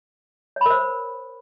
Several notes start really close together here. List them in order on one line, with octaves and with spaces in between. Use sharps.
C#5 B5 A#4 C5